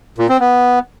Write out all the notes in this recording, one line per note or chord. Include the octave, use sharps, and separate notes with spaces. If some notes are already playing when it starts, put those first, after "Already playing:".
A#2
C4
B3